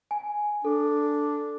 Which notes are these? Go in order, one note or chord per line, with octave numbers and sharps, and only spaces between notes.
G#5
D4 A4